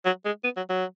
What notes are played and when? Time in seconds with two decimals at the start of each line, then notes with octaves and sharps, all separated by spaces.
0.05 F#3
0.25 G#3
0.44 B3
0.57 F#3
0.69 F#3